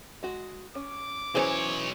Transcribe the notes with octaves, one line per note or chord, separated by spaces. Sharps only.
G#3 F#4
C#4 D6
B1 E3 F#3 C#4 G#4 C5 C#5